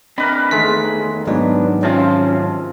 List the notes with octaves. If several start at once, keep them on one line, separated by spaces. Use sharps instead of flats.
C4 D4 A#4 B4 D#5 B5
E2 D#3 G#3 A3 B6
G#2 F#3 B3 D4 D#4
C3 D#3 F3 C#4 F4 A5